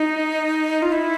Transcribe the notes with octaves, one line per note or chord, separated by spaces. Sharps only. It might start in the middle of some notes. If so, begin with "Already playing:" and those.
Already playing: D#4
F4
E4